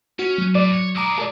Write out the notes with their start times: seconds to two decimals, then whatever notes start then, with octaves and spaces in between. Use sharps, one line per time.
0.19 C#4 F#4
0.38 F#3
0.55 A2 D5
0.74 C#5
0.96 G#3 E4 A#5 D6 D#6
1.18 A4 D5